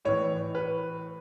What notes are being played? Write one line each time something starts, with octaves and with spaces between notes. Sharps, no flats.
A2 E3 C#5
B4